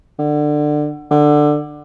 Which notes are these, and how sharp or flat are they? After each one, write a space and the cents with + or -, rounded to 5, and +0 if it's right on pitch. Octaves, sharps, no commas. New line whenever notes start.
D3 +20
D3 +15